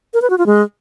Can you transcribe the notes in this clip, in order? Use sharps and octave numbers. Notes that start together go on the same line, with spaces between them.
A#4
B4
F#4
F4
G#3